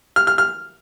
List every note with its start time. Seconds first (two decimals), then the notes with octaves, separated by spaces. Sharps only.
0.16 F6
0.27 F6
0.38 F6